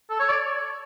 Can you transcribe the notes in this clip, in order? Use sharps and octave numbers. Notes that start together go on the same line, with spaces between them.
A4
C#5
D5